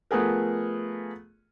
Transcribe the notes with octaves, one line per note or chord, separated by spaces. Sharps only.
F3 A3 B3 G#4 A#4